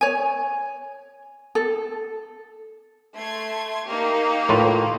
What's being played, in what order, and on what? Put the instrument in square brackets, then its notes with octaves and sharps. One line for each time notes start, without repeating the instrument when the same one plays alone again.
[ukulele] C#5 G#5
A4
[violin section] A3 C6 G#6
A#3 D#4 G4
[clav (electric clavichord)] A2 F4 B4